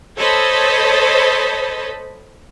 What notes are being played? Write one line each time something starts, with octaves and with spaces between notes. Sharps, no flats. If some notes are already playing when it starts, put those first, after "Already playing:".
A4 C5 C#5 D#5 A5 B5